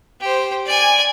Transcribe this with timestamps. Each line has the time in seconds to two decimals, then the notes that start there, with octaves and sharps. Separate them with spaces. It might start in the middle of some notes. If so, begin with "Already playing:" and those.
0.21 G4 C5
0.66 D5 G#5